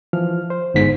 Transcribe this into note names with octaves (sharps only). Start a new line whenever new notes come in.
E3 F3 F6
C5
G1 G#2 B6